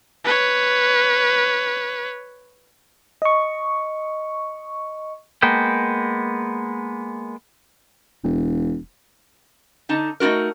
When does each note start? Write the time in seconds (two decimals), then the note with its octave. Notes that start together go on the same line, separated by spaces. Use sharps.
0.25 B4 C#5
3.22 D#5 C#6
5.42 G#3 A#3 B3 G5
8.24 E1
9.89 D3 D#4 A5
10.20 A3 D#4 E4 F#4 A#4